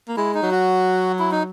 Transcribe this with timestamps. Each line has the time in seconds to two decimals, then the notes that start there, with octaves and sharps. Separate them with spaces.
0.08 A#3
0.17 G#3 E4
0.35 D#4
0.42 F#3
0.51 F#4
1.19 E4
1.32 D#4